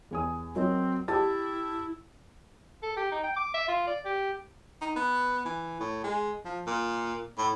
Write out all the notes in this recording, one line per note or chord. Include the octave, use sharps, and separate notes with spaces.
E2 G#5 D#6
F#3 C4 A#4 D#5
E4 G4 A5 A6
A4
G4
D#4
G5
D6
E5
F4
D5
G4
D#4
B3
E3
A2
G#3
F3
A#2
A2